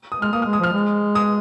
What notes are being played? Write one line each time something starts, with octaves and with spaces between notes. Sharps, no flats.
D#6
G#3 F6
A#3 D#6
F6
G#3
D#6
F3 F6
G#3
D#6